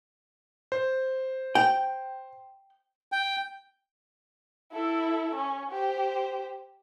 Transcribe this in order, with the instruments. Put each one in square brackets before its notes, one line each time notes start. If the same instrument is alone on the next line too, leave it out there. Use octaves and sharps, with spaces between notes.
[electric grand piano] C5
[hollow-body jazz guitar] G5
[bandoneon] G5
[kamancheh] E4 A4
C#4
G4 C5